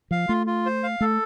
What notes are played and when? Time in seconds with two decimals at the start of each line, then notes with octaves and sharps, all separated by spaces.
0.11 F3 F5
0.29 A3 F4
0.47 F4
0.66 C5
0.83 F5
1.01 A3 A4